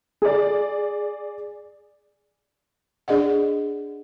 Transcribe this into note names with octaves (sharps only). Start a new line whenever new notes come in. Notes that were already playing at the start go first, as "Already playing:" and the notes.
G#4 D5
D4 G#4 D5 D#5 F#5